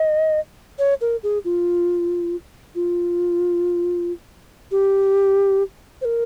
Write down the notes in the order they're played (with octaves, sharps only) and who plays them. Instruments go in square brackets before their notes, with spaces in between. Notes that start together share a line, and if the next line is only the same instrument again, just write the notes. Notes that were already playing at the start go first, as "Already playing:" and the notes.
Already playing: [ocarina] D#5
C#5
A#4
G#4
F4
F4
G4
C5
A#4